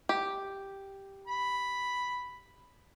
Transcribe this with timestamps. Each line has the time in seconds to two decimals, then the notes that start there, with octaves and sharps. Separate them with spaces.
0.09 G4
1.27 B5